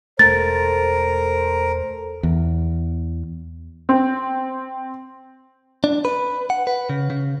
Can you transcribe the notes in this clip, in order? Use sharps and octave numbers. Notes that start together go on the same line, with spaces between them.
E1 A3 A4 A#4 C5 A6
E2
C4
D4
B4
F#5
B4
C#3
C#3